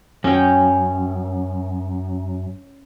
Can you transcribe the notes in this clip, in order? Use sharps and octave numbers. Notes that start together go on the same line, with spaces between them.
F#2 C#4 G5